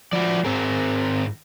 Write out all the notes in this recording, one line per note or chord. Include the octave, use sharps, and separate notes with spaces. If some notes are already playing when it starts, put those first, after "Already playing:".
F3 F#4 B4 D5
G#2 C4 G#4 A#4